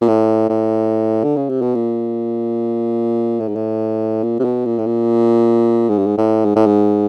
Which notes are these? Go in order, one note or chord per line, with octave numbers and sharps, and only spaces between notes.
A#2
A2
A2
D3
C#3
C3
B2
A#2
A2
G#2
A2
A#2
C3
B2
A#2
A2
A#2
G#2
G2
G#2
A2
G#2
A2
G#2